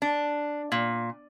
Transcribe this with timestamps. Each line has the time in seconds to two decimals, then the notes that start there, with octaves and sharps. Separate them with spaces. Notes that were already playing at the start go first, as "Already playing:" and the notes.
0.02 D4
0.72 A#2